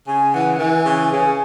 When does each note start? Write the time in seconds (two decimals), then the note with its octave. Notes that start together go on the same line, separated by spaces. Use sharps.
0.07 C#3 G#5
0.34 E3 F#5
0.55 F#5
0.60 E3 G#5
0.86 C#3
1.12 C#3